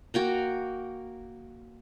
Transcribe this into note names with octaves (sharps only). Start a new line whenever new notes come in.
A#3 F#4 G5 A#5